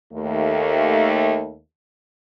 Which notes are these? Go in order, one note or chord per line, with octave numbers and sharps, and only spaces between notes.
D#2 A3